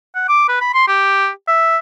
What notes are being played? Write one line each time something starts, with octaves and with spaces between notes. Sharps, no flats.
F#5
D6
B4
B5
C6
G4
E5